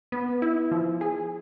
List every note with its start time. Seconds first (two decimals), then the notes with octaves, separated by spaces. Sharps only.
0.12 B3
0.42 E4
0.71 F3
1.01 G#4